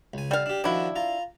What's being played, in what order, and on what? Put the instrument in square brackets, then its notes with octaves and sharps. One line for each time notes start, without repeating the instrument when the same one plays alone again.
[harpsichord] C#2 G#5
[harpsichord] D3 [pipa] G3 F5
[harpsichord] D4 G4
[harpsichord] D#3 F3 F#4 [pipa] D4 E4
[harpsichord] F4 A#5